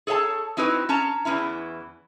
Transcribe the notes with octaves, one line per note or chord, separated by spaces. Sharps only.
G#4 A4 C#5 F5 A5
C4 D#4 E4 F#4 B4 C5
C#4 A5 A#5
E2 E3 C#4 E4